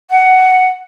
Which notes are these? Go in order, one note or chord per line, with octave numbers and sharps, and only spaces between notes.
F#5